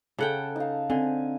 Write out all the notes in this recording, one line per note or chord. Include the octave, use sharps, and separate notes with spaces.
C#3 A4 F#5 G5
D#4 F5
D3 C4 G#5